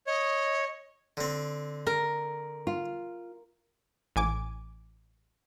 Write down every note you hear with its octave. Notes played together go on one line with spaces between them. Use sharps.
C#5 D#5
D3 C4
A#4
F4
A1 G#5 D6